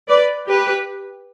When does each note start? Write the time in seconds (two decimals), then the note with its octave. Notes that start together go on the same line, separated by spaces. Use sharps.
0.09 B4 D5
0.46 G4 B4